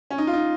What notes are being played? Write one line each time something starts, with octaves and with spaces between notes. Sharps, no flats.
C#4
D#4
F4
D#4